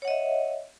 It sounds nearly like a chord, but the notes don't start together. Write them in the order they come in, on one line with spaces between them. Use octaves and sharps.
C#5 F#5 D#5 E5